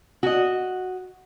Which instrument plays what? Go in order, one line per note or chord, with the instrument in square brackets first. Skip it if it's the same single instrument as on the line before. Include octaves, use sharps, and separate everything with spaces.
[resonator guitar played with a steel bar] F#4 D#5